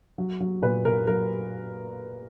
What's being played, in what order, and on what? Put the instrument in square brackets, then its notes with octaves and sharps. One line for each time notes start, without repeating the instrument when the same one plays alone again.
[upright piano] F#3
F#3
A#2 B4
A#2 A#4
F#3 A#4